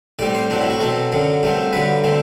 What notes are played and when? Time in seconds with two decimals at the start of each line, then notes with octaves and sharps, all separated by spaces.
0.19 A2 G3 C4 D5
0.35 C5
0.50 A2 F#3 C4 D4
0.61 E4
0.70 F#4
0.80 B2 F#3 C4 A4
1.12 F#2 D3 F#3
1.43 G2 F#3 A3 C4
1.73 G2 D3 F#3 B4
2.04 D3 A3 C4